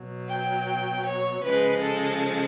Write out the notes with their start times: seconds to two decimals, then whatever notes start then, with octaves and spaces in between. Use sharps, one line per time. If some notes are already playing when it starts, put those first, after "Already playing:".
Already playing: B2 F#3
0.28 G5
1.04 C#5
1.43 C#3 F3 G#3 B4
1.81 A4